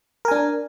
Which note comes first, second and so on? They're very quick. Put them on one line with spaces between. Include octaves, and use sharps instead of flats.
A#4 G#5 D4